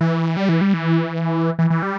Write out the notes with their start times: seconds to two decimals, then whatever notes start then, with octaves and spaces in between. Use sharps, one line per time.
0.01 E3
0.37 G3
0.49 E3
0.61 G3
0.74 E3
1.59 E3
1.70 E3
1.83 G3